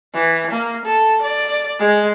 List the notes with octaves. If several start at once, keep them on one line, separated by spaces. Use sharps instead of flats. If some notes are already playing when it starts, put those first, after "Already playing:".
E3
A#3
A4
D5
G#3